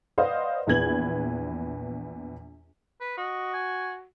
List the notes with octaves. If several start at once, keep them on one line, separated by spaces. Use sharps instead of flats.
B4 C5 D5 D#5 F5 F#5
A#1 E2 B4 G#6 F#7
B4
F#4 D#5
G#5